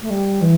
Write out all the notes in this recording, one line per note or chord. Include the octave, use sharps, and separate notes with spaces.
A3
G3
E3